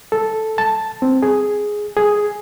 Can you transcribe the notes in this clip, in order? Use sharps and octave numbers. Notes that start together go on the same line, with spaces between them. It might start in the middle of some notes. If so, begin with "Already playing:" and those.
A4
A5
C4
G#4
G#4